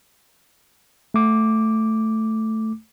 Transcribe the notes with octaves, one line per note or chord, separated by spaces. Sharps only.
A3 D6